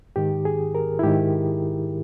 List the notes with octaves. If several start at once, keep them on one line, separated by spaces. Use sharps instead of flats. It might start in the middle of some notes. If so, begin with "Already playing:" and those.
G#2 D#3 G4
G#4
A#4
E4
G#2 D#3 G4